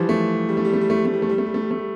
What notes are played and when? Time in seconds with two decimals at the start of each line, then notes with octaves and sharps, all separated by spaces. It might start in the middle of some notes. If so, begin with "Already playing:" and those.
Already playing: E3 F3 G3
0.09 A3
0.49 G3
0.57 A3
0.65 G3
0.73 A3
0.81 G3
0.90 A3
0.98 G3
1.05 A3
1.14 G3
1.22 A3
1.29 G3
1.38 A3
1.46 G3
1.54 A3
1.62 G3
1.71 A3
1.78 G3